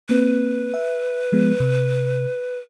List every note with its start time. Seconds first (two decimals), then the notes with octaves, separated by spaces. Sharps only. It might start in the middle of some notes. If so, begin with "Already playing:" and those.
0.09 A#3 C4 B4
0.74 E5
1.32 F3 G#3 B3
1.60 C3